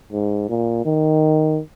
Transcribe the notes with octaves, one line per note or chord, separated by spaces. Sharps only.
G#2
A#2
D#3